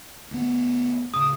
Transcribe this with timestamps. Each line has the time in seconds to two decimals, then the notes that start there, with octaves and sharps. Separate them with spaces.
0.31 D2 B3
1.14 D1 C#3 D#6